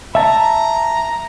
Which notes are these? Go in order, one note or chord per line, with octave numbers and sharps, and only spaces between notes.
E5 A5 A#5